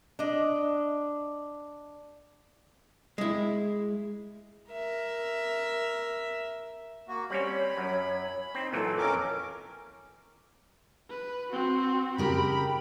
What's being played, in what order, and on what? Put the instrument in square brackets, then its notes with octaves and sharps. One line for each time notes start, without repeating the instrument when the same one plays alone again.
[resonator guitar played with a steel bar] D4 D#5
[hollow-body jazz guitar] G#3 E4
[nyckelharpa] A#4 E5
[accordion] A#3 F#4
[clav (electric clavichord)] G3 C4 C#4 [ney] C#5 [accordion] B5
[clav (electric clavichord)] F#2
[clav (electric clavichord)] C4 [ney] D#4
[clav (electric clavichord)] A#2 E3 F#3 [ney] A4
[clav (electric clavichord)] F2 [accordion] C#4 A#4 D6
[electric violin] B4
C4 F#4
[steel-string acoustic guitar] C#3 G4 A#4 [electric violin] B5